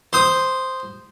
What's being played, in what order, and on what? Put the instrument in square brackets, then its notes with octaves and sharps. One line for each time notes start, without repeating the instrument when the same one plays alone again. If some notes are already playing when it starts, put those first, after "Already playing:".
[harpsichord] C5 D#6